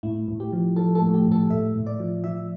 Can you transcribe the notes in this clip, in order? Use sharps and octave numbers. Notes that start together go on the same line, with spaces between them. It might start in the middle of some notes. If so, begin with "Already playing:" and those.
A2 E4
A2
G4
F3
F3 A4
A4
A2
G4
A2
A4
A2 E5
A2
D5
F3
F3 E5